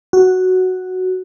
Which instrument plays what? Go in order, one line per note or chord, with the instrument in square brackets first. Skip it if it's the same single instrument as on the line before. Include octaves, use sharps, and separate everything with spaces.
[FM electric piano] F#4